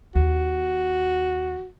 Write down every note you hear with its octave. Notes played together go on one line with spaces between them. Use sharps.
D#2 F#4